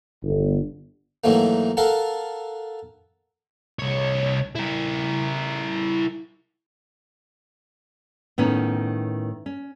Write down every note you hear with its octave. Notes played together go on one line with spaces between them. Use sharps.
G1
G#2 E3 F#3 A3 A#3
A4 A#4 F5 F#5 A5
C2 C#5
E4 A#4
A2 D#3 B3 C#4
C#4